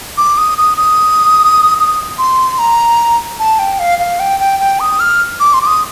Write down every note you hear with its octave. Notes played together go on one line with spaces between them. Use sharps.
D6
D#6
D#6
D#6
D#6
C6
A#5
A5
G5
F5
F5
G5
G5
G5
D#6
F6
D6
C6
D6
D#6